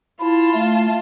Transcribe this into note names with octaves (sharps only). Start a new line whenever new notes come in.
E4 F4 A5
A3